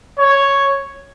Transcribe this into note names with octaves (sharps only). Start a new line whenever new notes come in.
C#5